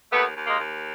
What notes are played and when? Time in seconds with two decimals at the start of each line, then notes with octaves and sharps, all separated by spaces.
0.12 D#2 A3 B3
0.35 D#2
0.47 G#3 A#3
0.58 D#2